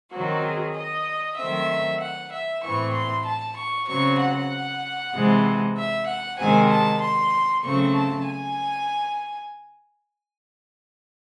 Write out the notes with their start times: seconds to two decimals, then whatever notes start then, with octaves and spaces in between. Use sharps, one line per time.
0.12 D#3 F#3 C4 F#4
0.44 G#4
0.76 D#5
1.38 D#3 F#3 A3 C4 E5
2.01 F#5
2.32 E5
2.63 A2 E3 C4 C#6
2.94 C6
3.26 A5
3.57 C#6
3.88 C#3 F#3 C4 C#6
4.20 F#5
5.14 C3 E3 G#3 C4
5.77 E5
6.07 F#5
6.39 C3 D#3 G#3 C4 G#5
6.70 A5
7.01 C6
7.64 C#3 F#3 A3 C4 C#6
7.95 A5
8.27 G#5